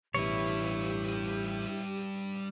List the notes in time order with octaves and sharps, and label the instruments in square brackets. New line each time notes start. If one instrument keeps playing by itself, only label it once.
[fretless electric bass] A1 B2 E3 [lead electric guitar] G3 B4 [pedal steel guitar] E4 C#5 [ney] G4